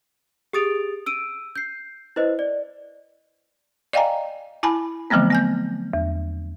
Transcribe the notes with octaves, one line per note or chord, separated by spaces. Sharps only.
G4 G#4 D#6 A6 D7 F7
E6 D7 D#7
G6 C7
E4 B4 C5 D#5
D5
D5 D#5 F5 G5 G#5 A#5
E4 G#5 A5 B5
D3 F3 F#3 A3 B3 C4
B3 G#5 G6
E2